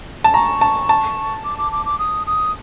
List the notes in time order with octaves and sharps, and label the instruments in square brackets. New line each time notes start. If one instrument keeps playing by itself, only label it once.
[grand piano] A5
[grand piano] A#5 [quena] C#6
[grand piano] A5
A5
[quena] D6
D6
D6
D6
D#6
D#6